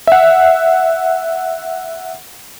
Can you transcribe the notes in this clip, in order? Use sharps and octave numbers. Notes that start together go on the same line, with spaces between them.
E5 F#5